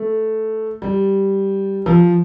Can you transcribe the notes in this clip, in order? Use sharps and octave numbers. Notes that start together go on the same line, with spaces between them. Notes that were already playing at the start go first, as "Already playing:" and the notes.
Already playing: A3
G3
F3